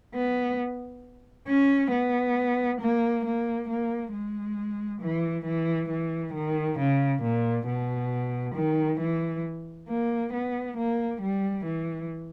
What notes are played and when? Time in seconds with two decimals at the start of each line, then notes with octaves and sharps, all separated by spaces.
0.14 B3
1.48 C#4
1.91 B3
2.81 A#3
3.25 A#3
3.69 A#3
4.12 G#3
5.02 E3
5.45 E3
5.90 E3
6.34 D#3
6.78 C#3
7.23 A#2
7.67 B2
8.55 D#3
9.00 E3
9.88 A#3
10.33 B3
10.77 A#3
11.21 G3
11.65 E3